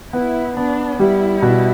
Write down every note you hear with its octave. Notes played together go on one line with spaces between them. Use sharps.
B3 E4
B3 D4
G3 E4
B2